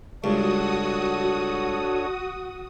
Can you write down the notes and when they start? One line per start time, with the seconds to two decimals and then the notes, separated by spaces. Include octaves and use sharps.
0.24 C#2 G2 D4 F#4 A4 C#5 D#6